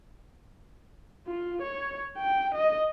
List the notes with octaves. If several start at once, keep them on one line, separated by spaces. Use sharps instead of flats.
F4
C#5
G5
D#5